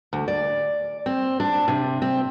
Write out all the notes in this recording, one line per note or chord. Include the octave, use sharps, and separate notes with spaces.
D2
D5
C4
D4
C3
C4